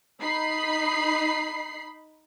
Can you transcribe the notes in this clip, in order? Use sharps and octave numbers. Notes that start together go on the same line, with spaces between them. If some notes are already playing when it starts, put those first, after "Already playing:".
D#4 B5 C7